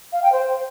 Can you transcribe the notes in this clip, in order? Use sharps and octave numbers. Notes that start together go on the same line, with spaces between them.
F5
G5
C5